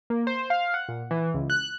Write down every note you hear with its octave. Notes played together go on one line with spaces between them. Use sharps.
A#3
C5
F5
F#5
A#2
E3
C#2
F#6